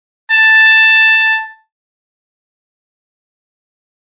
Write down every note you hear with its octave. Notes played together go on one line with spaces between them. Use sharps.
A5